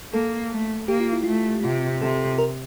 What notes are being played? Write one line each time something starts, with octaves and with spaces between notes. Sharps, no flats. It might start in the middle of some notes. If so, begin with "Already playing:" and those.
A#3 A4
A3
A#3 G4
F4
E4
A3 F4
C3 F4
C3 A4
A#4